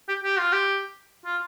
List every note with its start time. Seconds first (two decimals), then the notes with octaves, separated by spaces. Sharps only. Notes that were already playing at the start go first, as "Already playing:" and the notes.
0.08 G4
0.24 G4
0.38 F4
0.52 G4
1.25 F4